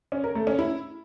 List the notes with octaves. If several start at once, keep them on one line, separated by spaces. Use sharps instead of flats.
C#4
A#4
A3
C#4
E4